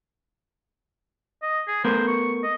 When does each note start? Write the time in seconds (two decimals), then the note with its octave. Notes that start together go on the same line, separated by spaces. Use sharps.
1.42 D#5
1.67 G#4
1.84 A3 B3 A#4 C5
2.07 C#6
2.43 D#5